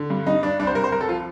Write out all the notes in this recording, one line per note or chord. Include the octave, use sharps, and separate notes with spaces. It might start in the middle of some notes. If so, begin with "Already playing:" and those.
Already playing: D3
G2
G2 D#4
G2 D4
C2 D4
C5
C2 A#4
C5
C2 A#4
A4
F3 F4